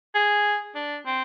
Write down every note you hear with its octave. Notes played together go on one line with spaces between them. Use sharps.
G#4
D4
C4